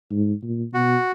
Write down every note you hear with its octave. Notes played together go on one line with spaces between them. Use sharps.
G#2
A#2
B2 F#4